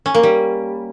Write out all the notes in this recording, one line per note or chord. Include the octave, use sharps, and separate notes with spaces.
C#4
A#3
G3